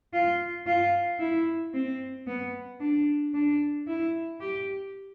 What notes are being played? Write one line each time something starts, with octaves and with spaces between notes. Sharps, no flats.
F4
F4
E4
C4
B3
D4
D4
E4
G4